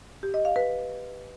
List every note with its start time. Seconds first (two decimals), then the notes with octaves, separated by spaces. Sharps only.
0.23 G4
0.34 D#5
0.45 F5
0.56 B4